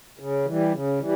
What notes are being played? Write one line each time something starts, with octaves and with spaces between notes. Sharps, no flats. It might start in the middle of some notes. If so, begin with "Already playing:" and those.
C#3
E3 G3
C#3
E3 G3